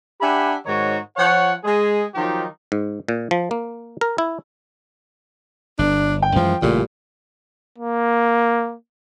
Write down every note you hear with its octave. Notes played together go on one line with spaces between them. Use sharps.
D4 G4 E5 F#5 G#5 B5
G#2 D#3 D#4 F#4 C#5
F3 C#5 F#5
G#3 G#4
D#3 F3 F#3 D#4 F4 G4
G#2
A#2
F3
A#3
A#4
E4
G1 D4
G5
F#2 E3 F3 G#3
A1 A#2 C#3 G3 A3
A#3